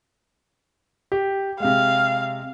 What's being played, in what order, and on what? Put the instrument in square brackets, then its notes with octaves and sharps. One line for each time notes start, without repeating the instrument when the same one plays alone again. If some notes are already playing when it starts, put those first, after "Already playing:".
[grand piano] G4
[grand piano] C3 G#3 [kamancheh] F5